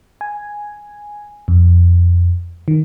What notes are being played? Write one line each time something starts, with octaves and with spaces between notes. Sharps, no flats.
G#5
F2
D#3